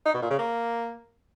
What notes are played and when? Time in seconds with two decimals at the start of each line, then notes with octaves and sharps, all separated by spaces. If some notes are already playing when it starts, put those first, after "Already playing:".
0.06 D#4
0.14 B2
0.22 A#2
0.30 C#3
0.39 A#3